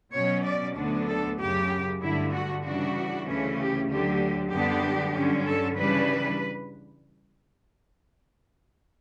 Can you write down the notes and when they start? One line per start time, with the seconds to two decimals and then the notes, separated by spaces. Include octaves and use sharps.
0.13 B2 F#3 C#4 C#5
0.45 D5
0.75 D2 D3 F#3 B3 D4
1.07 A4
1.38 F#2 C#3 F#3 G4
2.02 G2 D3 A3 E4
2.32 F#4
2.64 C#3 E3 G3 D4 F#4
3.26 D2 C#3 E3 A3 C#4
3.57 G4
3.88 D2 D3 F#3 G4
4.50 F#2 D3 G3 B3 D4 G4
5.13 G2 D3 F#3 C#4
5.45 A4
5.75 C#3 E3 G3 D4 B4